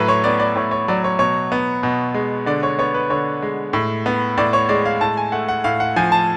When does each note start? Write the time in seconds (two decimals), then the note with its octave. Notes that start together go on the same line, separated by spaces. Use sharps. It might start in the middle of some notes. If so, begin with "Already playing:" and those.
Already playing: A2 F#3 B4
0.08 C#5
0.24 B3 D5
0.40 D5
0.56 A2 C#5
0.71 C#5
0.88 F#3 D5
1.04 C#5
1.19 B2 C#5
1.52 B3
1.83 B2
2.14 G#3
2.46 D3 D5
2.63 C#5
2.79 B3 C#5
2.94 B4
3.10 D3 C#5
3.42 G#3
3.73 A2
4.06 B3
4.38 A2 D5
4.53 C#5
4.69 G#3 D5
4.85 F5
5.01 A2 A5
5.17 G#5
5.32 A3 F#5
5.48 F#5
5.64 A2 F5
5.80 F#5
5.96 F3 G#5
6.12 A5